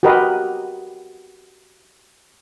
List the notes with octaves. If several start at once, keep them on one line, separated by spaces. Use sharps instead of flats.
F#4 G4 A#4 B4 D#5